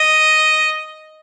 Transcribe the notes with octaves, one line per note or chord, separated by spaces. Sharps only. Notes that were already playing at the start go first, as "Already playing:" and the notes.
Already playing: D#5